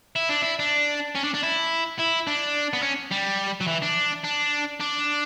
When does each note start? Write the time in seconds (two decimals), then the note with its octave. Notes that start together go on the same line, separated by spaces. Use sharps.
0.16 E4
0.29 D4
0.42 E4
0.59 D4
1.15 C#4
1.24 D4
1.34 D4
1.43 E4
2.00 E4
2.27 D4
2.73 B3
2.83 C#4
3.12 G3
3.61 F#3
3.67 E3
3.82 D4
4.24 D4
4.80 D4